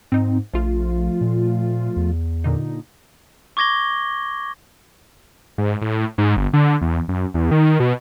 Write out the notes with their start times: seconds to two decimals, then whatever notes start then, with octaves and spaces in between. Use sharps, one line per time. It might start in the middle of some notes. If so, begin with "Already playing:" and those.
0.12 G#2 C4 D#4
0.53 A#1 F3 A3 F4
1.21 A#2
1.96 E2
2.44 A#2 D3 D#4
3.57 C#6 D6 G#6 A#6 G7
5.58 G#2
5.82 A2
6.18 G#2
6.37 G1
6.53 D3
6.81 E2
7.08 F#2
7.34 E2
7.51 D#3
7.80 B2